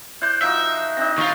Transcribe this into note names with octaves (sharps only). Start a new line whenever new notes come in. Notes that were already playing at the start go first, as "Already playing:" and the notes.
E4 C5 D5 F#6 G6
F3 D#4 F#4 E5
C4 D4 D#4 A#6
D#2 F4 C#6